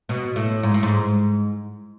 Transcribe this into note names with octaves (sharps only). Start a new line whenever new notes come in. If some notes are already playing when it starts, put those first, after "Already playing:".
B2
A2
G#2
A2
G#2